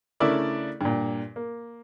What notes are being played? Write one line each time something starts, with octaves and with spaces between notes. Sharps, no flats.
C#3 A3 D4 E4 A#4 D5
G2 A#2
A#3